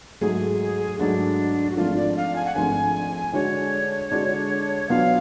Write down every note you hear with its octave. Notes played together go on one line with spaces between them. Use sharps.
G#2 F#3 A3 G#4
G#2 F#3 A3 D4
F#4
G#1 G#2 F3 A3 D4 F4
D5
F5
G#5
F#5
G#1 G#2 F3 A3 D4 G#5
D3 G#3 D4 F#4 C#5
D3 G#3 D4 F#4
B2 F#3 B3 D4 F4 F5